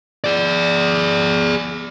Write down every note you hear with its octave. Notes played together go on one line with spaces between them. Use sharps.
G#4 D5